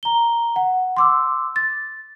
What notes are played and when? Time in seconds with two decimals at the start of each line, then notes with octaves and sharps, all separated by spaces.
0.03 A#5 G7
0.56 F#5
0.97 C6 D6 E6
1.56 A6